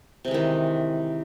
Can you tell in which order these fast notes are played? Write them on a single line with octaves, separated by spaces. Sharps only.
C3 G#3 E3 D#3